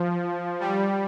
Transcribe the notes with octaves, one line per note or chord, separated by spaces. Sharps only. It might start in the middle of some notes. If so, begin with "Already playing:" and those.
Already playing: F3
G3